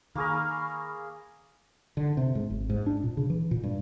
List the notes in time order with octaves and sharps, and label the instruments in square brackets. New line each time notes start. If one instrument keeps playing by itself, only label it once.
[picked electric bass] D#3 [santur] A#3 G#4 A#4 [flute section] B5 C#6 F6
[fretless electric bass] D3
C3
G#2
G#1
G#2
D4
A#2
C#3
E3
A#2
G2